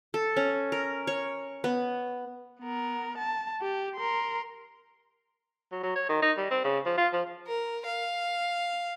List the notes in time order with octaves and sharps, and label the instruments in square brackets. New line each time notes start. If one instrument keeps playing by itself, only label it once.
[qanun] A4
C#4
A#4
C#5
B3
[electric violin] B3 A#4
A5
G4
A#4 C6
[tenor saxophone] F#3
F#3
C#5
D#3
D#4
G3
C4
C#3
F3
F4
F3
[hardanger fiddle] A#4
F5